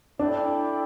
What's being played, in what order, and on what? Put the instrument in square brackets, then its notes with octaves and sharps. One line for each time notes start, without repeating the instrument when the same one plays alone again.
[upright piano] D4 [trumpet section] E4 A4 D5 G5